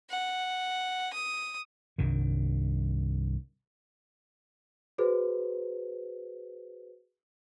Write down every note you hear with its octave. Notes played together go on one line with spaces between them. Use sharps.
F#5
D#6
C2 G2 D#3
F#4 G#4 B4 C5